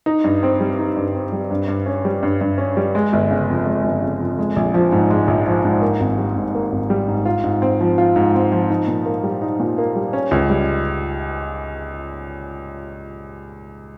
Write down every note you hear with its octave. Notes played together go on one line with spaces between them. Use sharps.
D#4
G2
C4
G3
D#4
G2
C4
G3
G2
G2
C#4
G3
G2
G2
C#4
G3
G#3
G1
C#3
F2
G#3
G1
C#3
F2
G#3
A#1
F3
G#2
G#3
A#1
F3
G#2
A#3
G#1
G3
G#2
A#3
G#1
G3
G#2
F4
G#2
C4
F3
F4
G#2
C4
F3
D#4
A#2
A#3
G3
D#4
A#2
A#3
G3
C#4
C#2
G3